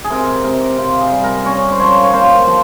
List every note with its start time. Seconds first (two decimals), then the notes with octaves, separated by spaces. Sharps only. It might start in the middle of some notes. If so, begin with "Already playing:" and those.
0.04 G#4
0.10 C3 A#4
0.28 G4
0.44 C3 A#4
0.61 G4
0.78 C3 F4
1.01 G#4
1.12 G3
1.24 A#4
1.45 C#4 C#5
1.72 C5
1.80 F3 C#5
2.04 C#5
2.13 A#3 C5
2.48 F3